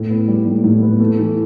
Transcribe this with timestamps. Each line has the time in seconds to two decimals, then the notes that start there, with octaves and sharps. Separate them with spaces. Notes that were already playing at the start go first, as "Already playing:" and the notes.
Already playing: A2
0.10 B3
0.28 G3
0.46 A2
0.64 A2
0.82 B3
1.00 A3
1.19 E3